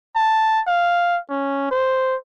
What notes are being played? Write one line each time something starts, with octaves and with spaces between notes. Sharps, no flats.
A5
F5
C#4
C5